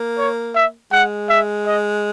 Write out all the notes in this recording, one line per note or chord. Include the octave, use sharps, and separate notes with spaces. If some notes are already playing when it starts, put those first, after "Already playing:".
Already playing: A#3
C#5
E5
G#3 F#5
E5
D#5